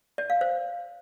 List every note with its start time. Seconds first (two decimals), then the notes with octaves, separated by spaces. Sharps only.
0.18 D5
0.30 F5
0.41 C5